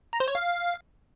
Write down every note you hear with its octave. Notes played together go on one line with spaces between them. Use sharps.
A#5
C5
C#5
F5